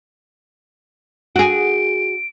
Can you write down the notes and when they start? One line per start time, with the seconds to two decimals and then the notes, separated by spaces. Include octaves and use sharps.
1.36 F#4 G#4 D7